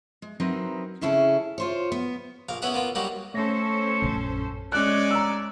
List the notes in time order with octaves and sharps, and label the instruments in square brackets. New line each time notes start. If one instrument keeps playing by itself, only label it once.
[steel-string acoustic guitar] G#3
F#3 C4 D#4 E4 A#4 B4
C#3 C#4 E4 G#4 A4
F4 C5 C#5
B3
[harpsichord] A#1 A#4 F5
B3 C#4 E4 G#4 F#5
A#3 B3 F4
F#3 G3 A#3 D#4 F#4
[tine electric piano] A3 A#6 [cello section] C#4 A4 C5 [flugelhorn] C#5
[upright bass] A#1 F#2
[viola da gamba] G#3 C#4 D5 [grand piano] F#6
[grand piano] A#5 E6